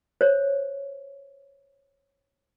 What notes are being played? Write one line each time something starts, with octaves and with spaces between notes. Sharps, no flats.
C5 C#5